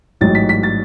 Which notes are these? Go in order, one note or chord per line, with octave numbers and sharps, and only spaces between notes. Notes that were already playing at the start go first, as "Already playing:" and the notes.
A1 G#2 F#3 A6
B6
B6
A6